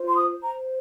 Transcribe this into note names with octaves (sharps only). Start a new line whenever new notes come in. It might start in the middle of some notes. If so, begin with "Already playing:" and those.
Already playing: F4 C5
C6
D#6
C5
A#5